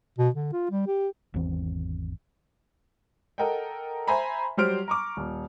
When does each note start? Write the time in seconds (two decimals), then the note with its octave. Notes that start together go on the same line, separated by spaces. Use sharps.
0.19 B2
0.35 D3
0.53 F4
0.71 G3
0.87 G4
1.34 G#1 E2 E3 C4
3.38 A4 A#4 D#5 F#5 G5
4.07 C5 E5 G#5 A#5 B5
4.57 F#3 G3 C5 F6 D7
4.88 A#5 C#6 D6
5.17 D#1